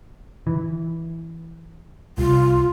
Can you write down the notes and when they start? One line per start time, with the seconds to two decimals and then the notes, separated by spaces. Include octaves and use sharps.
0.47 E3
2.18 C2 F4